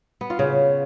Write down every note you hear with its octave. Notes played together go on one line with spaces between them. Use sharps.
B3
F4
C#3